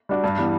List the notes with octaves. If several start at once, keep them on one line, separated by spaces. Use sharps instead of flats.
G3 D4 F#4
G2
E3 G3 B3